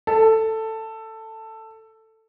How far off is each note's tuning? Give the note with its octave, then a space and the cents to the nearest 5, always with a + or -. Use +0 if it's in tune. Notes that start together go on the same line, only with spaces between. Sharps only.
A4 +10